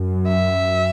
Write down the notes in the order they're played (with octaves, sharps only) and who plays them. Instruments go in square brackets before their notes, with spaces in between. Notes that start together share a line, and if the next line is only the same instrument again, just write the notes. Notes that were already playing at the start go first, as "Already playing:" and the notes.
Already playing: [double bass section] F#2
[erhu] E5